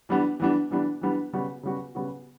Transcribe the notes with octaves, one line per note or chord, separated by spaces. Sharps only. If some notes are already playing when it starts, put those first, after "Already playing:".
E3 G3 B3 D4
E3 G3 B3 D4
E3 G3 B3 D4
E3 G3 B3 D4
C#3 G3 B3 F#4
C#3 G3 B3 F#4
C#3 G3 B3 F#4